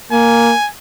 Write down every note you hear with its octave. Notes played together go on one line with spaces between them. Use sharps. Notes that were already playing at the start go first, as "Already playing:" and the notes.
A#3 G#5